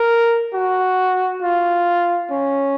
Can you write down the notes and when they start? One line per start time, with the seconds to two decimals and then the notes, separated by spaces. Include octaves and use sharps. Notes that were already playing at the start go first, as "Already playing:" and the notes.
Already playing: A#4
0.53 F#4
1.42 F4
2.31 C#4